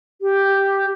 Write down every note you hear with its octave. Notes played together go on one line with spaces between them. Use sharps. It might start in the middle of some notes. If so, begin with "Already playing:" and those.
G4